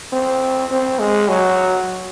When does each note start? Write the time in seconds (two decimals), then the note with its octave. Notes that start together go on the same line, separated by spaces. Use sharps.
0.13 C4
0.70 C4
0.99 G#3
1.28 F#3